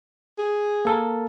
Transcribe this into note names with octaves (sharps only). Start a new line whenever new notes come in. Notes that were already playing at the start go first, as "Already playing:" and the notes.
G#4
A#3 A4 A#4